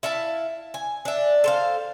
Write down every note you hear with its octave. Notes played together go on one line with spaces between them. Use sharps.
E4 E5 F5 A5
G#5
D4 E5
A4 C5 F5